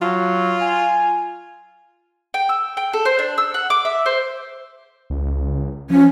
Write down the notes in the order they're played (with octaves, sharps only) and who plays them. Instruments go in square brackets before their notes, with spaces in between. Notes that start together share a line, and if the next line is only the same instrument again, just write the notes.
[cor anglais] F#3 [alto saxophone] F4
[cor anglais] G#5
[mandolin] G5
E6
G5
A4
C5
D4
E6
F#5
D6
E5
C5
[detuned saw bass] C#2
[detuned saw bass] F3 [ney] C#4